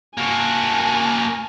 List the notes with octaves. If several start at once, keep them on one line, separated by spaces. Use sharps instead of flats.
A#3 F#4 G#5 A5